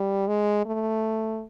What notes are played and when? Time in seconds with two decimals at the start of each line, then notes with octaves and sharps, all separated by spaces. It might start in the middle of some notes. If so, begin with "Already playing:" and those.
Already playing: G3
0.28 G#3
0.66 A3